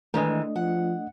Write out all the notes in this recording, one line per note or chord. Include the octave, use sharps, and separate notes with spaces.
D#3 E3 G#3 A3 D4 D#5
F3 F#5